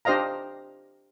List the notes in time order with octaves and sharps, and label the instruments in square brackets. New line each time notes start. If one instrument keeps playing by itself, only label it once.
[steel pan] D4 G4 C5 D#5 F5 A#5